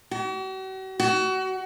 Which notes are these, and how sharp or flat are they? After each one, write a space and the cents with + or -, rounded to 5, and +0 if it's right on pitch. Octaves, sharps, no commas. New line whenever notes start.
F#4 +45
F#4 +30